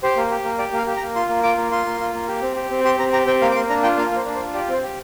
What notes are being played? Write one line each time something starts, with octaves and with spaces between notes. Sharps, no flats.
G4 C5
A#3
G4
A#3
G4 D5
A#3 F5
G4
A#5
A#3
F4 C6
A#3
F4 D6
A#3
F4 C6
A#3
F4
A#3
G4
C4
G4
C4
G4 C6
C4 A#5
G4 A#5
C4 G5
A#3 F5
D6
A#3 C6
D4 A#5
F4 G5
A#3 F5
A#3 C5
D4
C5
F4
G4 D5
C4 C5
G4